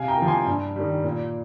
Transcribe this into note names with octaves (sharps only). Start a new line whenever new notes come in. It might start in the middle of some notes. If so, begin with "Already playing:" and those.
Already playing: C3 F5 G#5
G5 A#5
F3 A#3
G#5 C6
G2
D#3 G3
A#2